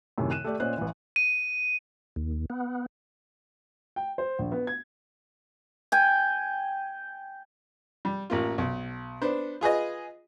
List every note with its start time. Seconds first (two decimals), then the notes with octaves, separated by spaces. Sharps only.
0.18 F#2 A2 C3 D#3
0.31 F#6 D#7 E7
0.44 A3 G4 D5
0.60 A#2 C#4 C5 D#5 F#6
0.77 A1 E3
1.16 D#7
2.16 D#2
2.50 B3
3.96 G5
4.18 C5
4.39 A#1
4.52 B3
4.67 G#6
5.92 G5 G#5
8.05 G3
8.30 A1 A#3 F4
8.58 B1
9.22 B3 D4 C5
9.61 F4 G#4 B4 D#5